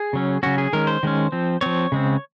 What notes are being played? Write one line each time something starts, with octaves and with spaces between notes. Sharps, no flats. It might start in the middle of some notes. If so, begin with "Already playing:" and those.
Already playing: G#4
C#3 F#3 C#4
C#3 F#3 C#4 F#4
G#4
D#3 G#3 C#4 A#4
C5
D#3 G#3 C#4
F3 C4
F3 C4 C#5
C#3 G#3 C4